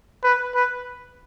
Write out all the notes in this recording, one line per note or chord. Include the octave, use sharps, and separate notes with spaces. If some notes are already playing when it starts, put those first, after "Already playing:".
B4
B4